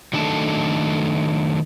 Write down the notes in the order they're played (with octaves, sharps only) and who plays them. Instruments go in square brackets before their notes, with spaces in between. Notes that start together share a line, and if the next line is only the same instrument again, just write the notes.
[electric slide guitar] D#3 F#3 A3 D4 A4 A5